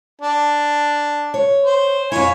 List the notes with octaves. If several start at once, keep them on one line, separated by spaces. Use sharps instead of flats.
D4
C#5
C5
F2 E4 C#5 G#5